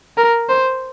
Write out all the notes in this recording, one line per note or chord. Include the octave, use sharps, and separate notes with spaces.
A#4
C5